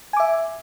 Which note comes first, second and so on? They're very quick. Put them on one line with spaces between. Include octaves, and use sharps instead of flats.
G#5 D6 E5